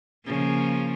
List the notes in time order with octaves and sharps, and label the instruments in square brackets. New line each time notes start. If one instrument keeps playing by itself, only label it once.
[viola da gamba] C#3 F3 A#3